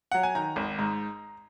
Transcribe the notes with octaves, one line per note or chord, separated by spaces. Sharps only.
F#3 F#5
G#5
D#3 A#5
G#1
G#2